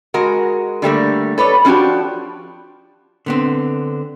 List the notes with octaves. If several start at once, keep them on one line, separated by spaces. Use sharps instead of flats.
G#3 F#4 A#4
D3 G3 A3 A#3
A4 B4 C#5 D5
F3 C#4 D4 F#4 G4
D3 B3 C4